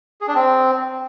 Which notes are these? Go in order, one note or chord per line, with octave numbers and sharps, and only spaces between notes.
G#4
D4
C4